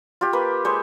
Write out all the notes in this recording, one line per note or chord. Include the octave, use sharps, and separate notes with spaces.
F4 G4
A#3 B4
G#3 C5 C#6